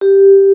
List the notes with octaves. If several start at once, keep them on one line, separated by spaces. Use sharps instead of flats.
G4